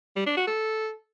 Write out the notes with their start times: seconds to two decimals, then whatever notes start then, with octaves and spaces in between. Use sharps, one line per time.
0.16 G3
0.26 D4
0.37 F#4
0.47 A4